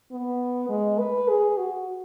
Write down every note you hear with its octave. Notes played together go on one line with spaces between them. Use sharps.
B3
G#3
B4
G#4
F#4